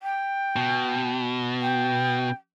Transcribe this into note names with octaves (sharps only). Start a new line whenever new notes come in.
G5
B2
G5